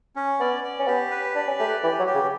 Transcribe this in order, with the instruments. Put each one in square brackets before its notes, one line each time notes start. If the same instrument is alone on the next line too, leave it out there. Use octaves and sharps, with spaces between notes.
[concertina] C#4
[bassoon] B3 [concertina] D5
[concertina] D5
[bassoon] C#4
[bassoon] B3 [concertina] G4
[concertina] B4
[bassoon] D4 [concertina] D5
[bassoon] C#4
[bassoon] A3 [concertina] G4
[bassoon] E3 [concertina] G4
[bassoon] F#3
[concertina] G4
[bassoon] C#3